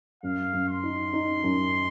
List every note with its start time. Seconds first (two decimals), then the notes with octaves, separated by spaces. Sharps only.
0.23 F#2 F5
0.53 F#2
0.68 C6
0.83 D#4
1.13 D#4
1.44 F#2